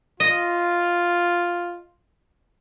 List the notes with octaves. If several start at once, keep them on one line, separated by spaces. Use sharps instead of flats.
F4 D#5